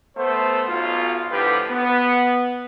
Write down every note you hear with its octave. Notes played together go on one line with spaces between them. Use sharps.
A3 B3 C5
B1 F4
A2 D3 F3 G4 B4
B3